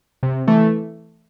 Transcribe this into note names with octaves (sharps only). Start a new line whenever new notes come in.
C3
E3 A3